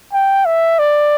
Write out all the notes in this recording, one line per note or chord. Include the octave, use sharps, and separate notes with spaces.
G5
E5
D5